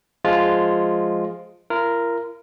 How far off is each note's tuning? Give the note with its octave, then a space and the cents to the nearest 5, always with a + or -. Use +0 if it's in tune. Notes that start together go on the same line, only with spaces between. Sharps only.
F3 +0 G#3 +0 F4 +0
F4 -45 A#4 +0